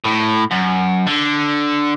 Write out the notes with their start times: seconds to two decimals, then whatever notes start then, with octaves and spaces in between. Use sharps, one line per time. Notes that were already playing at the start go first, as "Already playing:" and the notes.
0.04 A2
0.51 F#2
1.07 D3